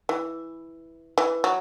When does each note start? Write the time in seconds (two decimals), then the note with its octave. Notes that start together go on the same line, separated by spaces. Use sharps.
0.09 E3
1.18 E3
1.44 F#3